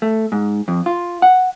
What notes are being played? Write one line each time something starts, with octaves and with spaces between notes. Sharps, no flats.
A3
G#2
F2
F4
F#5